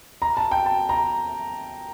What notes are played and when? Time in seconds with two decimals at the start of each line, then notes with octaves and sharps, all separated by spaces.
0.22 A#5
0.37 A5
0.51 G5
0.66 A5
0.89 A#5